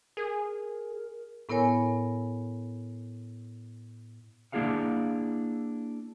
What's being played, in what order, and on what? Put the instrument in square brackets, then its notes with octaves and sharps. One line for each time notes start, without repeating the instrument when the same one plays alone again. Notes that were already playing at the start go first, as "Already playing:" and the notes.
[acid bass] G#4 [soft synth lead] A#4
[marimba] A2 B3 E4 A#4 C#5 G#5
[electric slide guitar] A#3 D4 E4 G#4 F5 F#5